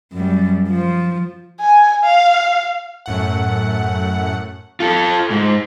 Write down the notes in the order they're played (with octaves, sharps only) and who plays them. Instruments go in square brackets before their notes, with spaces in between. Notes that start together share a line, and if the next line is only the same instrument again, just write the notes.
[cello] F#2 G3
F3
[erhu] G#5
F5
[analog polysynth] F#2 A2 F#5
[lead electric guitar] F4 A4
G#2